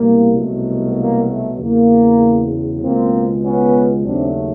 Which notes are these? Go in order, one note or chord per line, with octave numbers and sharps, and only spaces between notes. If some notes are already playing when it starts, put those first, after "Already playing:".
Already playing: C2 B2 G3 A#3
C2 B2 F#3 A3
A#3
A3
E2 C#3 F#3 A#3
C#2 B2 G#3 A#3 C4
B3 C#4
D#2 C#3 F#3 A3 C4 D4